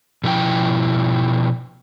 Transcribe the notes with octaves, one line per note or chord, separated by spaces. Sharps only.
B2 F3 E4 G5